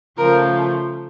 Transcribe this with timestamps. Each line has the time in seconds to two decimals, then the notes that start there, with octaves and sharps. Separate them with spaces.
0.18 C#3 F3 A3 A#4